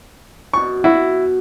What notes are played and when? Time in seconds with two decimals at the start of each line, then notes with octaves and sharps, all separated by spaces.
0.53 F#2 B2 C#6
0.84 E4 F#4